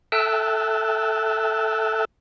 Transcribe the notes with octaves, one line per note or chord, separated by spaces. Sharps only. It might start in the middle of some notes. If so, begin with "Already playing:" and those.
A4 E5 G5 A5 E6 F#6